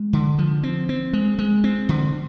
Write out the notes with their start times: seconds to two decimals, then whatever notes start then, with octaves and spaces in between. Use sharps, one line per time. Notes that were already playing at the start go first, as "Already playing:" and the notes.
Already playing: G#3
0.13 D3
0.38 F3
0.63 C4
0.89 C4
1.13 G#3
1.39 G#3
1.64 C4
1.89 D3